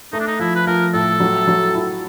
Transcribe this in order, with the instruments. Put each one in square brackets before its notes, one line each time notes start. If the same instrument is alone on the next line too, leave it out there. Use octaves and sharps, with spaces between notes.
[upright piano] A3 [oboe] D#4
[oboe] D4
D#4
[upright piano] F3 [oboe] E4
[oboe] B4
[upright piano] F3 [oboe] A#4
[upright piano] A2 [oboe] A4
[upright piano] F#3
F#3
E4